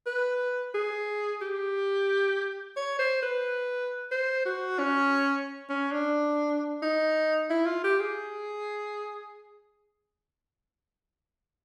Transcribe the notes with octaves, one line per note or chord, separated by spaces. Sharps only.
B4
G#4
G4
C#5
C5
B4
C5
F#4
C#4
C#4
D4
D#4
E4
F4
G4
G#4